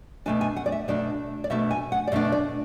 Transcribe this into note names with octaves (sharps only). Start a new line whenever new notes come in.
B2 A3 D4 G#5
G#5
F#5
D5
E5
B2 A3 D4 D5
D5
B2 A3 D4 E5
G#5
F#5
D5
B2 A3 D4 E5
D5